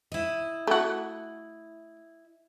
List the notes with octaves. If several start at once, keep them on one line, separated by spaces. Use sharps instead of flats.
E4 D#5
A3 F#4